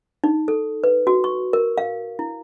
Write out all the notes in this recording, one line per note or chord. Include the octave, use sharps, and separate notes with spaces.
D#4
A4
B4
F#4
C#6
A#4
F5
E4